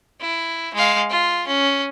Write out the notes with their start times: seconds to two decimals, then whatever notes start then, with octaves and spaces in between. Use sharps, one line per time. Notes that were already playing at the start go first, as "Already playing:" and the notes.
0.21 E4
0.74 G#3 F5
1.10 F4
1.47 C#4